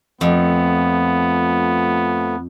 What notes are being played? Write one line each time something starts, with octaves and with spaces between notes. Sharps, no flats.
F2 F3 A3 B3